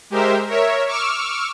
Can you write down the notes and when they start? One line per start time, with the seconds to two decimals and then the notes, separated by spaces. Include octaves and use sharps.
0.10 G#3 G4 A#4 C5 E5
0.47 A#4 C#5 E5
0.87 C#6 D6 E6 F6